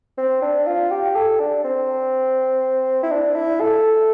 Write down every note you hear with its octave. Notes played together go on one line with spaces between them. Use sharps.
C4
D4
F4
G4
A4
D4
C4
E4
D4
E4
A4